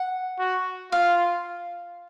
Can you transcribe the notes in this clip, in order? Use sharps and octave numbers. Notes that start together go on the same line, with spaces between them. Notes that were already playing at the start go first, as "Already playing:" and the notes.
Already playing: F#5
F#4
F4 F5